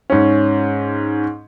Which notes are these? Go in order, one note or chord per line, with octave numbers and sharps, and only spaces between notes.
G#2 C#4